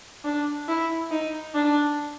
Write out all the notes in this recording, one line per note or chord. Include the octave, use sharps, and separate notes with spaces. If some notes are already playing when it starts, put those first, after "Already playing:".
D4
E4
D#4
D4